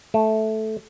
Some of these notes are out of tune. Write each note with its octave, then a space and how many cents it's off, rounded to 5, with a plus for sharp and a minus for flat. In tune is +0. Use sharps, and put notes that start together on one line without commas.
A3 -10